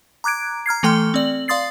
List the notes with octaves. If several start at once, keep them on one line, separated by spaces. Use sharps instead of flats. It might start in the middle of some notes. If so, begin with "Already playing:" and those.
A#5 D6 F#6 G#6 D7
A#5 F6 G#6 C7
E3 A3 A4 G5 C6 F6
C4 D5 F#7
D5 F5 C6 D#6 A6 C7